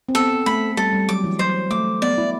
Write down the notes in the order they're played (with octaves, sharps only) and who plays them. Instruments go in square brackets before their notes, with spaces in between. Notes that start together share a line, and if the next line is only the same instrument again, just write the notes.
[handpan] C4
[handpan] B3 [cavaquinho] A4
[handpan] A3 [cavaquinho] B5
[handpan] G3 [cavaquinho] A4
[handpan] G3
[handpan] F#3 [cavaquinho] D6
[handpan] E3
[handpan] F#3 [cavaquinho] C5
[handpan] A3 [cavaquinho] D6
[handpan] B3 [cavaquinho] D5
[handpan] E4